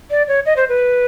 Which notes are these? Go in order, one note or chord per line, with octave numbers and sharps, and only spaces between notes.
D5
C#5
D#5
C5
B4